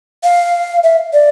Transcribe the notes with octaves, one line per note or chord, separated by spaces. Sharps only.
F5
E5
D5